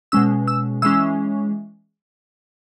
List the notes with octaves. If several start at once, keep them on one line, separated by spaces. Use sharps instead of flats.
B2 G#3 C#4 E6
E6
E3 G#3 C#4 E6